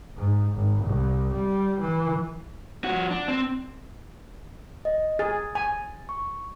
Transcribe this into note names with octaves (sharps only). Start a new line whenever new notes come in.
G#2
G#1
C2
G3
E3
F3 F#4
D4
C4
D#5
G#4 A6
G#5
C#6